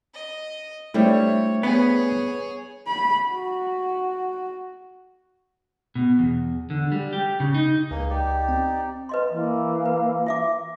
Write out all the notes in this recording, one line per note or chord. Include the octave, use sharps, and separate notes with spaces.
D#5
G3 A3 C4 D4 E4 C#5
B3 G#4 C#5
B5
F#4
B2
E2
D3
G3
G4
C#3
D#4
C#2 A#3 G#4
D#4 G4 D5
C4
B4 D#5 C6
E3 A#3
B4
E4 E5 D6